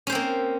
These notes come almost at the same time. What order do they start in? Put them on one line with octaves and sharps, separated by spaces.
C#4 C5 C4 A#3